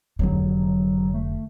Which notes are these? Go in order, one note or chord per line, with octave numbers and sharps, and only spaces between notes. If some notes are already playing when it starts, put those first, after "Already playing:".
F1 D3 F#3
A3